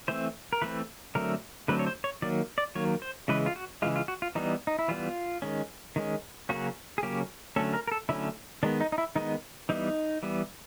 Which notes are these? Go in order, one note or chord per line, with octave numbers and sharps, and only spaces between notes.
E3 A3 C4 C5
A#4
E3 A3 C4 B4
D3 F#3 A3 C4 A#4
D3 F#3 A3 C4 B4
C#5
C5
C#5
D#3 F#3 A#3 D5
D5
D#3 F#3 A#3 C#5
C5
C#3 E3 G#3 B4
F4
F#4
C#3 E3 G#3 F4
F4
F#4
F4
E3 G3 B3 D#4
D#4
E4
E3 G3 B3 F4
D#3 G#3 C#4
D#3 G#3 C#4
C#3 F#3 A#3 C#4 F#4
G#4
C#3 F#3 A#3 C#4 G4
D3 F#3 A3 C#4 A4
A#4
A#4
A4
D3 F#3 A3 C#4 E4
D#3 G#3 B3 D4
D#4
D#4
E4
D#3 G#3 B3 D#4
E3 G3 B3 D#4
E3 G3 B3